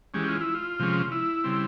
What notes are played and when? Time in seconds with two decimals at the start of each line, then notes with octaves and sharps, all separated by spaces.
0.14 E3 G#3 C#4 G4
0.28 F4
0.41 E4
0.55 F4
0.79 C3 F3 G#3 C#4
1.12 E4
1.44 C#3 G3 C4